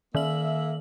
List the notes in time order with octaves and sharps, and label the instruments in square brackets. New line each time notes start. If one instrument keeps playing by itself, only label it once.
[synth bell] D#3 F#7 [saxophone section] A#3 E5